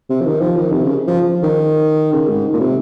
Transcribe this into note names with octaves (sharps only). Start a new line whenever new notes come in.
C3
F3
D#3
F3
D#3
C3
C#3
F3
D#3
C#3
G#2
A#2
C3